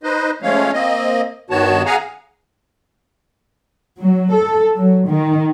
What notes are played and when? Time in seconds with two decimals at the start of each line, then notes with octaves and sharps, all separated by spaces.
0.03 D#4 B4 C5 D#5
0.42 F3 G#3 A3 C#4 C#5 F5
0.73 A#3 C4 D#5
1.50 G2 D#3 B3 F#4 C#5 A5
1.86 G#4 F5 F#5 G#5 A#5
4.00 F#3
4.33 A4
4.74 F#3
5.08 D#3